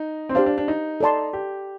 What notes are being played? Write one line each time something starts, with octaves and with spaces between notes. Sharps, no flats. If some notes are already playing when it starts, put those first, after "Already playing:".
Already playing: D#4
C4
D4 G4 C5 F5
D4
D4
D#4
A4 D5 A5 C6
G4